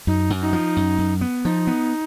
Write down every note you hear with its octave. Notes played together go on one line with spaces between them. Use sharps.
F#2 D#4
F#2
D#4
F3
F#2
F#2
B3
F3 D#4
B3